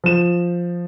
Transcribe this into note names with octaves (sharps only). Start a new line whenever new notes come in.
F3 E7